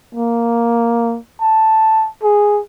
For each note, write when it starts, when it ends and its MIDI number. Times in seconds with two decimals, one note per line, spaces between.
0.15 1.18 58
1.41 2.08 81
2.23 2.61 68